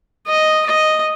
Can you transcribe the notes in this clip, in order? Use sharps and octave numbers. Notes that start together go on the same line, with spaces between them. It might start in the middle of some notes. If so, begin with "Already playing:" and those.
D#5
D#5